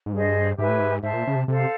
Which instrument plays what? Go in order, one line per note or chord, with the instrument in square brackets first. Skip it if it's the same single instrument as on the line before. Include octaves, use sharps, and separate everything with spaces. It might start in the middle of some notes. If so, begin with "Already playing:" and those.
[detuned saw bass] G#2
[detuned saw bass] G2 [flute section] G#4 C5 D#5
[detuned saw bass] G#2 [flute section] G4 B4 E5 G#5
[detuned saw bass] A2
G#2
[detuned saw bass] G#2 [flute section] C5 E5 A5
[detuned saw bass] A#2
C#3
C3
[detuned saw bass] C3 [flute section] A4 C5 F5